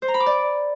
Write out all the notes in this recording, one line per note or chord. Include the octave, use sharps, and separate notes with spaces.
C5
A#5
B5
D6
D5